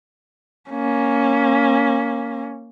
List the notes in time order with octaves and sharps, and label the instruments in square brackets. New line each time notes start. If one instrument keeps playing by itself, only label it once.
[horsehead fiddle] A#3 C#4